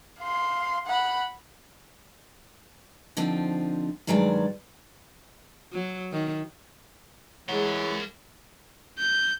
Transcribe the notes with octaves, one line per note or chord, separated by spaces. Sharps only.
F5 C6
F#5 B5
D3 F3 C4 D#4
G2 D#3 F#3 G#3 A4 D5
F#3
D#3
E3 G#3 A#4 C#5 F#5
G6